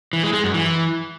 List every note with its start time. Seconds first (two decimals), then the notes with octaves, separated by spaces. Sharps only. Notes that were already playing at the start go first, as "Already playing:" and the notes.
0.13 E3
0.23 G#3
0.34 G#3
0.44 F#2
0.54 E3